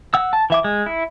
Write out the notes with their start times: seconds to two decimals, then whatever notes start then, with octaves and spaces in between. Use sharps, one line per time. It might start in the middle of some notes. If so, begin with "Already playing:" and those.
0.14 F#5 E6
0.33 A5
0.50 E3 E5 D6
0.64 G#3
0.86 E4